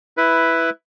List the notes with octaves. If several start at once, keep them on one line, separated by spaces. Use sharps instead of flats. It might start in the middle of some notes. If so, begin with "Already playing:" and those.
E4 B4